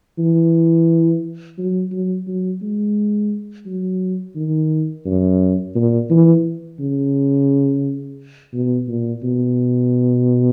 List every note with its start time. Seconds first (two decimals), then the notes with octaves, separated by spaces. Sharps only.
0.19 E3
1.58 F#3
1.92 F#3
2.27 F#3
2.62 G#3
3.66 F#3
4.36 D#3
5.06 F#2
5.75 A#2
6.10 E3
6.80 C#3
8.54 B2
8.88 A#2
9.23 B2